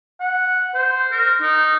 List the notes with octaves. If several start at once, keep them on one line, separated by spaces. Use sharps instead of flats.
F#5
C5
A#4
D#4